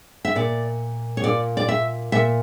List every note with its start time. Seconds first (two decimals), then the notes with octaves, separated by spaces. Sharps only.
0.25 E5
0.35 A#2 D5
1.17 C#5
1.24 A#2 D5
1.57 D5
1.68 E5
2.12 A#2 E5